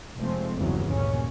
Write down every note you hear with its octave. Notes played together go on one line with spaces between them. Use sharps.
F1 F3 G#3 A3 C4
G1 E2 G2 C#3 E3 F#3
D#2 A#2 C#4